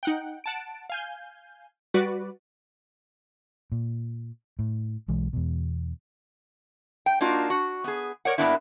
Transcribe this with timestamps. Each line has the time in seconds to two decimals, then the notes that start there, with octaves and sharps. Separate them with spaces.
0.03 D#4 F#5 G5
0.44 F#5 A5 D7
0.90 F5 G#5 G6
1.94 G3 F#4 B4 D5
3.72 A#2
4.59 A2
5.08 B1 E3 G#3
5.33 E2 B2
7.06 G5
7.21 A#3 D4 D#4 F4 F#4
7.50 F#4
7.84 B3 G#4
8.25 A#4 C#5 D5 F#5
8.38 G2 B2 A#3 B3 D4 E4